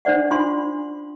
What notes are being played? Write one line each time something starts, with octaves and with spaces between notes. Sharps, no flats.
C#4 D4 C5 D5 F#5
D4 F4 B5 C6